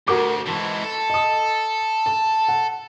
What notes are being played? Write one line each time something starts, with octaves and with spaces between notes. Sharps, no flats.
D2 F#4 A#4 D6
G#2 E3 A5 C6 C#6
A4
D#5 D#6
A5
F#5